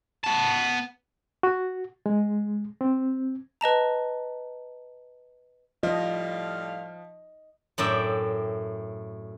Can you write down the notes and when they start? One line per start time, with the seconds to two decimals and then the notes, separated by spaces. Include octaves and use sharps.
0.24 B3 A5
1.43 F#4
2.06 G#3
2.81 C4
3.61 B4 D#5 A5 A#5
5.83 A2 F3 G3 D#5 F5
7.78 F#2 A2 D5 E5 G5